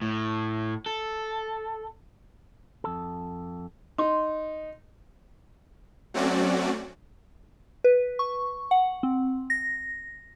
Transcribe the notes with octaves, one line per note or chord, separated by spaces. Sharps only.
A2
A4
F2 A4
D#4 C6
F#3 A3 C4 C#4 F#4 D5
B4
C#6
F#5
C4
A#6